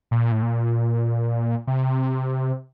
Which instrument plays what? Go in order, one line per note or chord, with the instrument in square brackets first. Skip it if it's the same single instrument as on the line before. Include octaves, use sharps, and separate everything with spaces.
[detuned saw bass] A#2
A2
A#2
C3